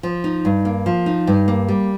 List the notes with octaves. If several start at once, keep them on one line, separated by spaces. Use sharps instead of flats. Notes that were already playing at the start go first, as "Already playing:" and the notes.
F3
D#4
G2
A#3
F3
D#4
G2
A#3
G3